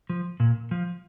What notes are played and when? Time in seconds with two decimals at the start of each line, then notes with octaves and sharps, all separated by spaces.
0.10 F3
0.40 A#2
0.71 F3